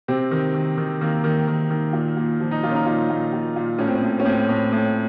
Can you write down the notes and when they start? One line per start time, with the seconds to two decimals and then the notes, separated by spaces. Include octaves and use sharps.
0.08 C3 C4
0.31 D#3
0.54 D#3
0.77 D#3
1.01 D#3 A#3
1.24 D#3
1.48 D#3
1.70 D#3
1.93 A#2
2.17 A#2
2.40 F3
2.51 D#4
2.63 A#2 F4
2.69 C#4
2.75 D#4
2.86 A#2 D#4
3.10 A#2
3.33 A#2
3.56 A#2
3.79 A2 C#4
3.87 C4
3.95 C#4
4.02 A2
4.20 C#4
4.25 A2 C4
4.49 A2
4.72 A2